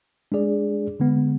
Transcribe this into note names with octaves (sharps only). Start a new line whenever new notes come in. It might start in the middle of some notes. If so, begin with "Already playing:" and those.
G#3 D4 G#4 D5
D3 G#3 B3